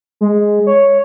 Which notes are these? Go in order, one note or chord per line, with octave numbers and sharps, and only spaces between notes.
G#3
C#5